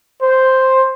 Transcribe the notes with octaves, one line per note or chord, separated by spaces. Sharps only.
C5